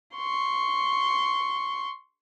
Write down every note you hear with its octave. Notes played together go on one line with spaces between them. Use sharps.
C6 C#6